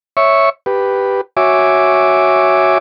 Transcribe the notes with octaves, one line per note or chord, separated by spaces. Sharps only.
C#5 E5 C#6
G4 B4
F#4 C#5 E5 G#5 D6